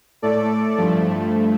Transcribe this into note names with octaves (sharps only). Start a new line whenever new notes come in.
A2 A3 A4 D5
G2 F3 A3